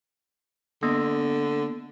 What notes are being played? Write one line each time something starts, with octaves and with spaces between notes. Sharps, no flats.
D3 A#3 B3 A#6